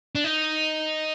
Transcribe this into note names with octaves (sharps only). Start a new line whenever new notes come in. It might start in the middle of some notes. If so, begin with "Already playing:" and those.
D4
D#4